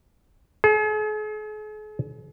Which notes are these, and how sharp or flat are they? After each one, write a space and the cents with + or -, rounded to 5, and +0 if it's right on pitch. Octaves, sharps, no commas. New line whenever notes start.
G#4 +45